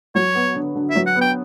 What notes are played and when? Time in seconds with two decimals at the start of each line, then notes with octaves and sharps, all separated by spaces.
0.15 F#3 C#5
0.35 B3
0.55 D3
0.76 D3
0.90 E5
0.95 F#3
1.06 F#5
1.16 B3
1.21 G5